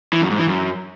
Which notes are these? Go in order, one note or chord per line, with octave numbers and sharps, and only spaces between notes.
E3
F#2
G#2
E3
F#2